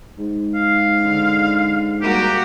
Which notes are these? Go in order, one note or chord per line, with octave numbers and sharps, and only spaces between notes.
G#2
F5
D3
G3 A#3 F#4 G4